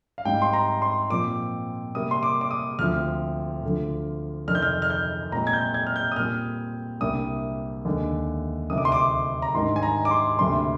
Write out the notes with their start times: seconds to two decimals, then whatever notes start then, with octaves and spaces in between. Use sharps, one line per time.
0.18 F5
0.25 G#2 G3 C4 G5
0.42 C6
0.53 A#5
0.82 C6
1.10 A#2 F3 C4 D6
1.95 C3 G3 A#3 D#6
2.11 C6
2.23 D6
2.41 D6
2.51 D#6
2.79 D2 D3 F3 C4 F6
3.63 D2 D3 F3
4.48 F2 C3 D#3 F6
4.55 G6
4.62 F6
4.82 F6
4.90 G6
5.32 A#2 G#3 C4 A#5
5.47 G#6
5.53 G6
5.74 G#6
5.87 F6
5.96 G6
6.12 D#6
6.16 A#2 G3 C4 F6
7.01 C2 C3 G3 A#3 D4 D#6
7.85 D#2 D3 G#3 D4
8.70 D2 C3 D#3 D#6
8.78 D6
8.85 C6
8.92 D6
9.42 A#5
9.54 G#2 D#3 G3 D4 C6
9.76 G#5
9.83 A#5
10.05 D6
10.11 C6
10.39 D2 C3 G3 A#3 D4 C6